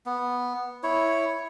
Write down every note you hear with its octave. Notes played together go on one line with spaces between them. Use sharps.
B3
E4 C#5